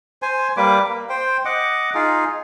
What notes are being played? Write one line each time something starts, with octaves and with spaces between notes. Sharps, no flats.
C5 G#5
G3 A#3 B4 D6
A#3
C5 G5
D#5 F#5 D6
D#4 F4 G#4